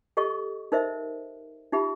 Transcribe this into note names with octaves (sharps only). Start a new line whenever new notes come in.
G4 A4 D#5 C#6
D#4 A#4 C5 D#5 E5
D#4 F4 G4 E5 B5